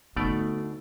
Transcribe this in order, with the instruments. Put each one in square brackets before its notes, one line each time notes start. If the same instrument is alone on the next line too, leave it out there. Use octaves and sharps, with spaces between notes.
[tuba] D2 [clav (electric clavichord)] B2 A3 D5 [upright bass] B3 D4 [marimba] D#4